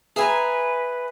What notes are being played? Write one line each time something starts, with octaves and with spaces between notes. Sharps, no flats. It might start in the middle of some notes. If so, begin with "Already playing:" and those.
G#4 B4 E5 G#5 A#5